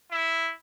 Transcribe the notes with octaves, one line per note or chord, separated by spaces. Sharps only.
E4